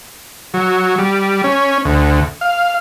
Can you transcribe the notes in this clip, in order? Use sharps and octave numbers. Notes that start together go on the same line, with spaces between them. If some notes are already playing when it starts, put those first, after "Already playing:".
F#3
G3
C#4
D2
F5